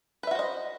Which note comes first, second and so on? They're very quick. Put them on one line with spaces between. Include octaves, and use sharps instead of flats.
B4 E5 F#4 C5 D#5